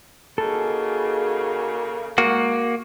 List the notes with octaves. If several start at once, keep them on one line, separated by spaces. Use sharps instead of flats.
C#3 A#3 D#4 F#4 G#4 A4
G#3 A#3 F#4